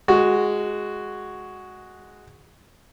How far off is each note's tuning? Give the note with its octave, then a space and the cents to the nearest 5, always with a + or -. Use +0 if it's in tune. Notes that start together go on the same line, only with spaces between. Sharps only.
G#3 +0 F#4 +0